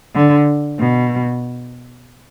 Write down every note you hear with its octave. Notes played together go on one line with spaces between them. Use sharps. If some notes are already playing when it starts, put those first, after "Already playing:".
D3
B2